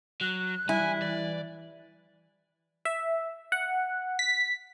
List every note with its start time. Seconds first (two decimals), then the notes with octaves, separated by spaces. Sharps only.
0.21 F#3 F#6
0.69 E3 G3 E4 G#5
1.02 E3 D5
2.85 E5
3.52 F#5
4.19 B6